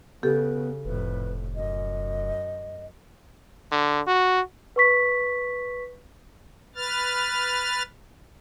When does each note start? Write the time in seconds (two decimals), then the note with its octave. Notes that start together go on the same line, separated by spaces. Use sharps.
0.23 C#3 B3 G4 A4 B4
0.85 F1 F2 A2 B4
1.56 F#2 D#5
3.72 D3
4.07 F#4
4.76 B4 C#6 B6
6.75 B4 F6 A6